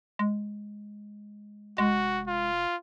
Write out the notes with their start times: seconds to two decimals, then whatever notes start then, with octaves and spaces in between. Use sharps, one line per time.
0.19 G#3
1.78 F1 G#3 F#4
2.27 F4